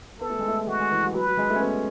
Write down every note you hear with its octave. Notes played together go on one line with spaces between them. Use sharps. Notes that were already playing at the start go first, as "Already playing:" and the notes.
B3 A4
A3
G#3
A3
G#3 F#4
G#3
E3
F#3
F#3 B4
F#3
G#3
A3
C#4
B3